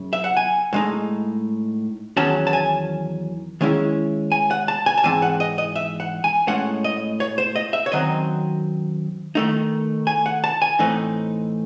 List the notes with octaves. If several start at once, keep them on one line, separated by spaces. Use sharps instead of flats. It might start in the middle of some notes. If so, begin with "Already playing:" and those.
Already playing: F#2 C#3
E5
F#5
G#5
A2 G#3 D#4
E2 D#3 F#3 C#4 A5
A5
G#5
D#3 G#3 C#4 E4
G#5
F#5
A5
G#5
A5
G#2 E3 C4 G#5
F#5
D#5
D#5
E5
F#5
G#5
A2 G#3 C#4 F#5
D#5
C#5
C5
D#5
E5
C#5
F#2 D#3 F#3 C4 D#5
D#3 A3 D#4
G#5
F#5
A5
G#5
A2 E3 A3 C4 D#4